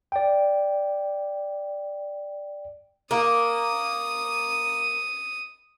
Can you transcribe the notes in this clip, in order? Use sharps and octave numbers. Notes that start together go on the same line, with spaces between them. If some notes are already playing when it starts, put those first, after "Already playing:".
D5 G5
A#3 D#6